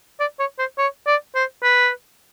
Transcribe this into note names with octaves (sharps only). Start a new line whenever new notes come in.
D5
C#5
C5
C#5
D5
C5
B4